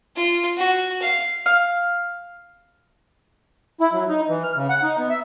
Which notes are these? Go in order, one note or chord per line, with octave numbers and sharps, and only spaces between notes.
F4
F#4
F5
F5
E4
F#3
D#4
E3
F6
C#3
F#5
D#4
B3
E5